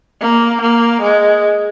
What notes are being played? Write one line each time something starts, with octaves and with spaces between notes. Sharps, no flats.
A#3
A#3
G#3